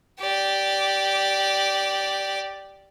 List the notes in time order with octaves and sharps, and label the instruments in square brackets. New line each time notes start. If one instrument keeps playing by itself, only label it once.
[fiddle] G4 D5